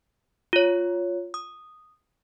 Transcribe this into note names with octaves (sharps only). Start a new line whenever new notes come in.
F4 C#5
D#6